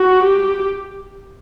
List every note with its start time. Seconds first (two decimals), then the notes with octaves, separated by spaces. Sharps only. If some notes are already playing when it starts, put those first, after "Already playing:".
Already playing: F#4
0.23 G4